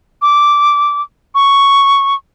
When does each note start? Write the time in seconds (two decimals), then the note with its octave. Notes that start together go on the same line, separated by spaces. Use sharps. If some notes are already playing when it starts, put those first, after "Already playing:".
0.22 D6
1.35 C#6